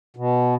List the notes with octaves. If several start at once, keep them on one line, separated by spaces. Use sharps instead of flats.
B2